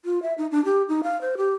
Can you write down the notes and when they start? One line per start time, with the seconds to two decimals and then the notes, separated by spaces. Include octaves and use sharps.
0.05 F4
0.22 E5
0.38 D#4
0.51 D4
0.65 G4
0.89 D#4
1.03 F5
1.21 C5
1.37 G4